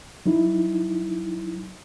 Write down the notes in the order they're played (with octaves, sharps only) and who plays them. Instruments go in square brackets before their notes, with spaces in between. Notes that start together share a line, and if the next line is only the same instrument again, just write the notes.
[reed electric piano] F#3 D#4 E4